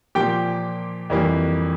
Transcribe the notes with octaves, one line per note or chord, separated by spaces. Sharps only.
A#2 F3 A#3 G4 G5
F2 E3 G3 A#3